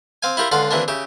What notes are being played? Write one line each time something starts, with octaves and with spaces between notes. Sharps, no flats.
C4 F5 G#5
E4 F4 G4 A#4
C#2 D3 F4 F5 F#5 C6
C3 E3 A#3 D4
C#3 G4 E5